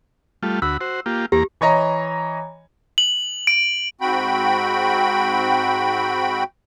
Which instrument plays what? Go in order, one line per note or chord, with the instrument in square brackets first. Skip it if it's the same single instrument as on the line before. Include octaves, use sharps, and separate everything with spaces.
[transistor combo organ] G3 A3 F4
[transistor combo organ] D2 F#4 B5 [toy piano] E6
[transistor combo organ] F#4 C5
A#3 F4 G4
[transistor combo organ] E2 A#3 A#5 [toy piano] G4
[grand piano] E3 C#5 D#5 A#5
[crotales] F#7
D7
[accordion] G#2 C4 F#4 G5 B5